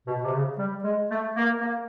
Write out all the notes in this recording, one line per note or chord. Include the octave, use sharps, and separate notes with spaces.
B2
C3
C#3
G3
G#3
A3
A#3
A#3